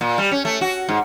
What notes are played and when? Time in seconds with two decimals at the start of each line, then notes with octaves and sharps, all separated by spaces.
0.01 A#2
0.18 G3
0.31 C#4
0.45 A3
0.61 F#4
0.89 G#2